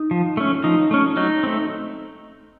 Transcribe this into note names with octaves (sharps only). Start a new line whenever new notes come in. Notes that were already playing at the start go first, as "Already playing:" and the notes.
Already playing: D#4
F3
A3 C#4
F3 D#4
A3 C#4
F#3 D#4
A3 C4